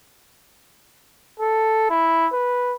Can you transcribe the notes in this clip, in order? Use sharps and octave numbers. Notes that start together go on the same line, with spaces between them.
A4
E4
B4